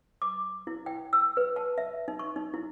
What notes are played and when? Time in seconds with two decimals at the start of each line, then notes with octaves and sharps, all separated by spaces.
0.22 D6
0.67 E4
0.86 G5
1.13 E6
1.37 B4
1.56 A5
1.78 E5
2.08 D#4
2.19 C#6
2.36 D#4
2.54 E4